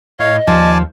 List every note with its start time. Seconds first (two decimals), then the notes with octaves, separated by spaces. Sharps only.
0.20 A2 C#5 D#5 F5
0.47 D#2 F3 D5 G#5 A5